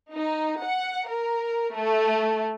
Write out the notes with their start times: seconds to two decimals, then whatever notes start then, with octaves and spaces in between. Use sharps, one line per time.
0.12 D#4
0.61 F#5
1.08 A#4
1.74 A3